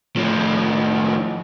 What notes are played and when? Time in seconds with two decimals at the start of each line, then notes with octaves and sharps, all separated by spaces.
0.16 A2 F3